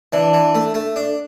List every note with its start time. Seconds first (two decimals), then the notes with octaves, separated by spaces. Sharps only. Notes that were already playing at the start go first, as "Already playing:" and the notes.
0.13 E3 D4
0.33 E3
0.55 A3
0.74 A3
0.96 D4